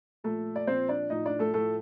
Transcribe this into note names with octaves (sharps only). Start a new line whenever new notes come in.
A#2 F3 A3 A4
D5
A#2 F3 C4 C5
D4 D5
A2 F3 D#4 D#5
D4 D5
A3 A4
A2 F3 A3 A4